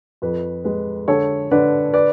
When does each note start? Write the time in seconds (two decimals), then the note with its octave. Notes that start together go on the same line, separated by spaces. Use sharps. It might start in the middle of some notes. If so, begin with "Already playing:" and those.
0.22 F2 B4
0.64 G#3 B4
1.08 D3 A4 C#5
1.51 D3 B4 D5
1.93 B4 D5